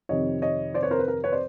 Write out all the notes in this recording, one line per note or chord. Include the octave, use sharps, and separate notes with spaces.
F2 C3 D#3 C#5 D#5
C#5 D#5
C5 D5
B4 C#5
A#4 C5
B4
A#4
B4 C#5
C5 D5